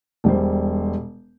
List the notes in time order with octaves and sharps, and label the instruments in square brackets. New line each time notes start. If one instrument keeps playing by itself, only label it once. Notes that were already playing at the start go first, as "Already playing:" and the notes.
[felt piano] E1 G3 C5